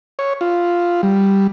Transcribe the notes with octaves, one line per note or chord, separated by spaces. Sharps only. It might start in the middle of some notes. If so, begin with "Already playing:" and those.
C#5
F4
G3